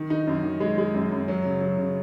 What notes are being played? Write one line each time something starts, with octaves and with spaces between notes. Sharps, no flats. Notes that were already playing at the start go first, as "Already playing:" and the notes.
Already playing: D#3
D#4
F#2
D#3
G#3
G#3
F#2
F#2
F#3
C#3
F#3
C#3